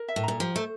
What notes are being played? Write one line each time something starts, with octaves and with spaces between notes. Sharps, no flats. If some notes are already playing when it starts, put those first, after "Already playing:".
Already playing: A#4
E5
A2
A#2 A#5
F3 G4
A3 C5